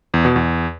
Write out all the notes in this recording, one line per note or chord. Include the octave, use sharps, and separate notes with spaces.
E2
B2
E2